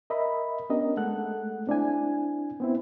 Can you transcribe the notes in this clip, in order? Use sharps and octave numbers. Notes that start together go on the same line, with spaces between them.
A#4 D#5 E5 B5
B3 C#4 D4 G4 A#4 D#5
G#3 A3 A4 F#5 F#6
C4 D4 E4 G#5
B3 C4 E4